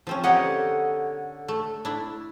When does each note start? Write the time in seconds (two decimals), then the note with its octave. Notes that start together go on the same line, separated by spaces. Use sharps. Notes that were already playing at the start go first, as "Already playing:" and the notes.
0.07 F3 C4 C#4
0.24 D3 A#3 G4 C#5 D#5 F#5
1.48 A3
1.85 D4 E4